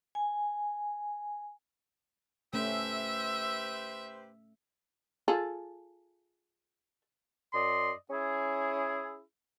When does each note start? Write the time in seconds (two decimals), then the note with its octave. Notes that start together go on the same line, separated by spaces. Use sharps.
0.15 G#5
2.54 A3 C#4 G4 B4 C5 E5 E6
5.28 F4 G#4 A4
7.54 F#2 D5 D#5 C6
8.10 C#4 E4 G#4